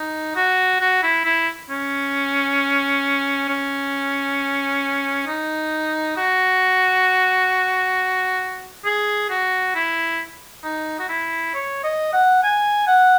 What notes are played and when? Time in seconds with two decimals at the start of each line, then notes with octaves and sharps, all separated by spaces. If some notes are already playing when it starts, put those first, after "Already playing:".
Already playing: D#4
0.36 F#4
0.80 F#4
1.03 E4
1.25 E4
1.70 C#4
3.49 C#4
5.27 D#4
6.17 F#4
8.85 G#4
9.30 F#4
9.75 E4
10.64 D#4
10.99 F#4
11.09 E4
11.54 C#5
11.83 D#5
12.13 F#5
12.43 G#5
12.87 F#5